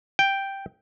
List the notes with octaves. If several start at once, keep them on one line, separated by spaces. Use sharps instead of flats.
G5